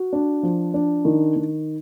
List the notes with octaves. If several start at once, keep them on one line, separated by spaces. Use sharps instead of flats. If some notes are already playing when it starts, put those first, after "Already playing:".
Already playing: F#4
D4
F3
D4
D#3
D#3